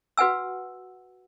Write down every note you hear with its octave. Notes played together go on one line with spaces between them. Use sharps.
F#4 B4 F#5 G#5 E6